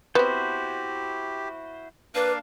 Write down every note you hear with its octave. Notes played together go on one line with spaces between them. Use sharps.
B3 C4 E4 F#4 G4 C5
A#3 D4 B4 F5